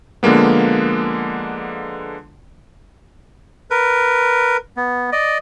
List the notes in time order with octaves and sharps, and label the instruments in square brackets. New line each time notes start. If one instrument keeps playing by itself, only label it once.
[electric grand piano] D3 F3 G#3 A#3 B3
[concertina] A#4 B4
B3
D5 D#5